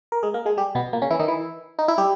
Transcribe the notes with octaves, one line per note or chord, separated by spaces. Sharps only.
A#4
G#3 G#4
A#3 A#4
G#3 G#4
G3 G4
B2 B3
A#2 A#3
C#3 C#4
E3 E4
D#3 D#4
E3 E4
D#4
E4
G3 G4